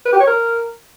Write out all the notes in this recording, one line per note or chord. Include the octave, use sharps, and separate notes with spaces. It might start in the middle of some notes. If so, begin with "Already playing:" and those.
B4
G4
C#5
A#4